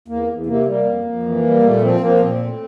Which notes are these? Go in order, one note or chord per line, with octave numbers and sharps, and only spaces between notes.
E2 A#3
E2
C3 A#3
G3 A#3
F2
F2
E3
G3
A#2 A3
A#3
F3 C4
F3 A#3
A#2 C4
A2